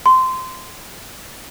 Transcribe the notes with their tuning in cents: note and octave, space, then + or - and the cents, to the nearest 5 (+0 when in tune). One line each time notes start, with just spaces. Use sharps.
C6 -15